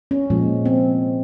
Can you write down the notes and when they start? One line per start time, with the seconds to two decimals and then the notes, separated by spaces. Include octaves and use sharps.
0.11 C#4
0.30 A#2 F3 G#3
0.65 C4